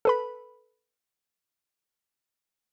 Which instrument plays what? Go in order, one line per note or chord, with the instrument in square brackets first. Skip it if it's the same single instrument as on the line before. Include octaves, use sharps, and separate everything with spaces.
[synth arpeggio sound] A4 B4 B5